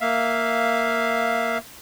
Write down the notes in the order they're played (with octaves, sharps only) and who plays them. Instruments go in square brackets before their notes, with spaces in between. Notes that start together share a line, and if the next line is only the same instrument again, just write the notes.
[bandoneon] A#3 E5 F5